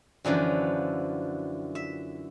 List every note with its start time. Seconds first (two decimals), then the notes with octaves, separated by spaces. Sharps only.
0.25 F#2 D3 E3 F3
1.75 E5